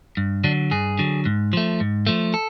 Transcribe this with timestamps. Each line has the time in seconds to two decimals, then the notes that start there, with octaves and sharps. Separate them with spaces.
0.17 G2
0.44 D3 F#3 D4
0.71 G2 G#4
0.99 D3 F#3
1.25 G#2
1.53 F3 A3
1.80 G#2
2.07 F3 A3
2.34 A4